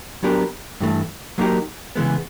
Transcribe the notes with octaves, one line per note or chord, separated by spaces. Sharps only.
F#3 B3 D4 G4 A#4
G2 E3 A3
F#3 A#3 D#4 G4 A#4
C#3 E3 G#3 B3